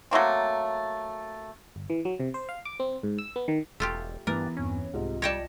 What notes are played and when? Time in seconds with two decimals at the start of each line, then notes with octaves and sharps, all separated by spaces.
0.11 F#3 A3 A#3 C4
1.76 G1
1.90 E3
2.05 F#3
2.20 C3
2.34 C5
2.49 F5
2.65 D6
2.80 C4
3.03 G#2
3.18 E6
3.36 B3
3.48 D#3
3.80 E1 A3 F4 G4
4.27 G2 E3 B3 A#4 D6 F#6 A6
4.57 E2 G2 C4 C#4
4.94 C2 G#2 C3 F4 D#5
5.22 G3 C#5 D5 G5 A5 A#6